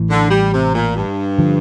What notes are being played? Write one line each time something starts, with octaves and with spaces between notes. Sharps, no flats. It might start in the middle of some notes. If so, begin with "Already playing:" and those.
Already playing: A1 A2 E3
D3
G3
C3
A#2
G2
D3 F3